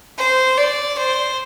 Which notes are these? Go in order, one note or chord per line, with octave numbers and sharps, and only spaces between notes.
C5
D5
C5